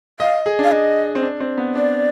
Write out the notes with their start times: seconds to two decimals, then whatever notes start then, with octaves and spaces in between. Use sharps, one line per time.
0.20 D#5 F5
0.46 G#4
0.59 D4
0.64 F5
0.72 D4 D#5
1.15 C4
1.23 D4
1.40 C4
1.58 B3
1.75 D4 D5